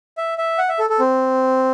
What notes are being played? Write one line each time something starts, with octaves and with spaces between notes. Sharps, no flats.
E5
E5
F#5
E5
A4
A4
C4